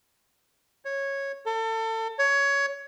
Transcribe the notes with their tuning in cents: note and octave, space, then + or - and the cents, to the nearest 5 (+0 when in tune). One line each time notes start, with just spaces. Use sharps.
C#5 -10
A4 +30
C#5 +15